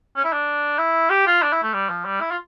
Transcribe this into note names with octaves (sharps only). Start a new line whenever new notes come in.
C#4
E4
D4
E4
G4
F4
D4
E4
A3
G3
F3
G3
E4
F4